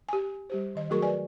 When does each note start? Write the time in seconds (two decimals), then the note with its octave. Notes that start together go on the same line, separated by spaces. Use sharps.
0.09 G4 G#5
0.50 G3 G4 C5
0.75 D#3 D#5
0.90 F#3 A3 F#4 G#4 A#4 C#6
1.02 B4 D5 G#5